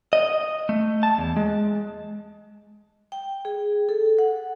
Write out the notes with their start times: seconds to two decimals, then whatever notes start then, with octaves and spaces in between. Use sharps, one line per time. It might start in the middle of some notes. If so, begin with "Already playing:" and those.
0.13 D#5
0.69 A3
1.03 A5
1.18 E2
1.37 G#3
3.12 G5
3.45 G#4
3.89 A4
4.19 F#5